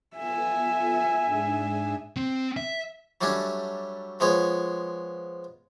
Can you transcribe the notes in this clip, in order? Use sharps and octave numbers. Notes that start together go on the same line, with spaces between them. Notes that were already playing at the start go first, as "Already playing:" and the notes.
B3 F4 A4 E5 G#5
G#2 D4 G#4
C4
E5
F#3 G3 A3 C#4 D4
F3 G#3 B3 C#5